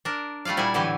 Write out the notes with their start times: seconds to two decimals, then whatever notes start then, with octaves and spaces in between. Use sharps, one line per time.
0.05 D4 A#4
0.45 G3 A3 F4 D5 F5
0.57 A#2 G3 E4 F#5 G#5
0.74 A2 D3 E3 F#3 G4 G#5